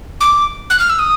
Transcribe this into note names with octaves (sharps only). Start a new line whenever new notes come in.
D6
F#6
F6
E6
D#6